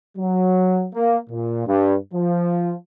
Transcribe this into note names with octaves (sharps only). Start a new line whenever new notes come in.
F#3
A#3
A#2
G2
F3